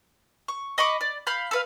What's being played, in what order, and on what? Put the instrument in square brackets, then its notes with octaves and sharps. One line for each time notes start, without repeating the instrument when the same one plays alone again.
[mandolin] C#6
D#5 B5 C#6 D6
D5
F5 B5 G6
A4 B4 F5